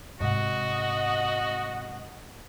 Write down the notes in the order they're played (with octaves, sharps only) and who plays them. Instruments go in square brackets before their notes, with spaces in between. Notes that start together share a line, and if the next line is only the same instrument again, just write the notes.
[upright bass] G#2 C3 [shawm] F#4 [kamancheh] D#5 F#5